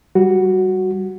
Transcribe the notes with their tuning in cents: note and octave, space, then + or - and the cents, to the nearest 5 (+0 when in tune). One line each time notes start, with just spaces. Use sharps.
G3 -15 F#4 +0